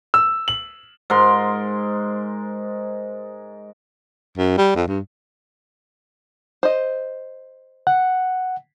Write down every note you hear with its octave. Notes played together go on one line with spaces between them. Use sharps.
E6
F#7
G#2 A#4 C6
F#2
G3
F2
G2
C5 D#5
F#5